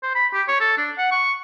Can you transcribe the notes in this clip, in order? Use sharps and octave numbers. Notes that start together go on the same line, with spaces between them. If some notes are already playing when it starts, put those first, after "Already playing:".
C5
B5
G4
C#5
A4
D4
F#5
C#6